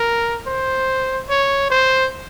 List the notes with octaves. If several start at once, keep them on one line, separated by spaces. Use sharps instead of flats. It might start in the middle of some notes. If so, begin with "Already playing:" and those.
Already playing: A#4
C5
C#5
C5